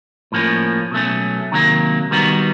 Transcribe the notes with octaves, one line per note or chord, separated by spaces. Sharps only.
A2 F3 A#3 C#4
B2 F#3 A3 C#4
C3 D#3 F#3 A#3
D#3 G3 B3 D#4 F#4